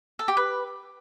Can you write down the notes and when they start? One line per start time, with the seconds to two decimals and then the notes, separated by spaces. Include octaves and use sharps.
0.19 A4
0.28 G4
0.37 B4